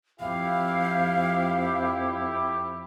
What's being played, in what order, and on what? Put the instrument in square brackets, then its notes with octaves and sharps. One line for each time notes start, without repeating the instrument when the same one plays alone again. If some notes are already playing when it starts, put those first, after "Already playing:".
[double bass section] F2 [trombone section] E4 G4 [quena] F5